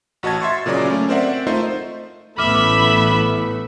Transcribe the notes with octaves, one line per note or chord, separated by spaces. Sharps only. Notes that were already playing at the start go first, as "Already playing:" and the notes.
A1 F#4 D#5 A5 G#6
E5 C6 C#6 A6
A#2 C#3 F#3 D5 D6
A3 C#4
C4 A#4 C5 D5 E5 F#5
A3 D#4 F4 C5 D#5 E5
A1 E3 A3 B3 E5 B5 D6 F6